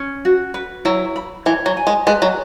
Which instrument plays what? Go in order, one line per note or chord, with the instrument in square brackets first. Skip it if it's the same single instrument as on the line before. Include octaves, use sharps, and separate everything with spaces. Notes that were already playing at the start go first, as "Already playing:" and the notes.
Already playing: [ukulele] C#4
F#4
B4
[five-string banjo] F#3 [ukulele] E4
[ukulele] B5
[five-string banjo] E3 [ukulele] C#5
[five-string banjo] F#3
[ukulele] G#5
[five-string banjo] G#3
[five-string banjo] G#3 [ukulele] B4
[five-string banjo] F#3